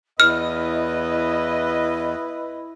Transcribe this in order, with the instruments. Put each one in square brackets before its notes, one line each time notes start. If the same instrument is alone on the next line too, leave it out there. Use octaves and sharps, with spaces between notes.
[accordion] E2 [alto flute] E4 [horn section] B4 D#5 [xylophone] F6